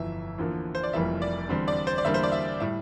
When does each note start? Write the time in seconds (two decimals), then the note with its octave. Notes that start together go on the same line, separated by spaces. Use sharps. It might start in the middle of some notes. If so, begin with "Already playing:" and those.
Already playing: G1 F2 E3 E5
0.38 E2 D3 F3 A#3
0.75 C5
0.83 D5
0.93 F1 F2 E3 G3 A#3 E5
1.22 D5
1.49 E2 D3 G3 C4
1.68 D5
1.87 C5
1.98 D5
2.05 E2 D3 G3 A#3 E5
2.14 C5
2.23 D5
2.32 E5
2.60 A2 G3 E5